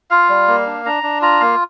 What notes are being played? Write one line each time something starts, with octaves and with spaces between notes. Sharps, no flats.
F4 F5
G3
A#3
D4
D4 A#5
D4
F4 A#5
A#3 F5